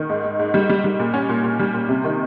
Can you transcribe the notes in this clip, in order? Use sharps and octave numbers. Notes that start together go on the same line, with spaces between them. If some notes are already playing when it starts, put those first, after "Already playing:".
Already playing: D#3
G#2
G#2
G#2
G3
G3
G3
A#2
C#4
A#2
A#2
G3
A#2
C3
D#3